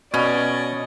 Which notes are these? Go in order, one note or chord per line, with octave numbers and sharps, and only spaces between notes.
B2 C#4 D5 D#5 C#6